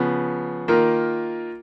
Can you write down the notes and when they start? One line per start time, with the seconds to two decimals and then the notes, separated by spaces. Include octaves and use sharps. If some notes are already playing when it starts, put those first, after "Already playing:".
Already playing: C#3 F3 B3
0.68 D#3 A#3 F4